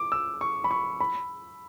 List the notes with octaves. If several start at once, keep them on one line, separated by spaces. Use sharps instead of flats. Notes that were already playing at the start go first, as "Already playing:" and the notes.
Already playing: D6
E6
C#6
B5
C#6
B5